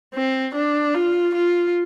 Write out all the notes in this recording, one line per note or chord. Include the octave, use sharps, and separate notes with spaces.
C4
D4
F4
F4